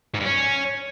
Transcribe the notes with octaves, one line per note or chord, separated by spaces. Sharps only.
G#2
G2
C#4